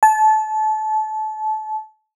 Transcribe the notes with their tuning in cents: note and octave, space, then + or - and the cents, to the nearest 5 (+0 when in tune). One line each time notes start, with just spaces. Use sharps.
A5 -25